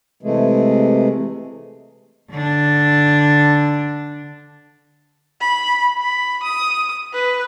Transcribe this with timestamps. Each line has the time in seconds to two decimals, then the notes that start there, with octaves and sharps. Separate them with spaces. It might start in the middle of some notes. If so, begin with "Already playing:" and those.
0.23 C3 E3 G#3 A3
2.31 D3 D4
5.41 B5
5.98 B5
6.43 D#6
7.13 B4